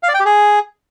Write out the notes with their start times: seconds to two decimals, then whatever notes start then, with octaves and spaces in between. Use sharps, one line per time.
0.03 F5
0.09 D5
0.14 G5
0.20 G4
0.25 G#4